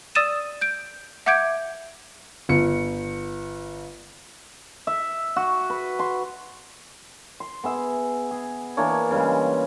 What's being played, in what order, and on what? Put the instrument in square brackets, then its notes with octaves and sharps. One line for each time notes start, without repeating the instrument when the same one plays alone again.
[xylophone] D5 D#6 E6 A6 D#7 E7
G6 D7
E5 F#5 D6 G6 G#6 D7
[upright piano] G1 C#7
[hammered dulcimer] E5
F#4
B4
C6
C6
B3 G#4 E5
G#4
E3 A#3 D4 C#5
C#3 G3 G#3